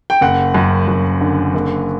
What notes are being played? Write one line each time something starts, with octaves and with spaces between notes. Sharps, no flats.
G5
F#1 F#5
F#2
F#2
D3
F#1